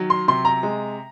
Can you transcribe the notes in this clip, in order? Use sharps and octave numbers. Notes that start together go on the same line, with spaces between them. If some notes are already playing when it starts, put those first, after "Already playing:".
Already playing: D#3 F#3
C6
C3 C6
A#5
G#3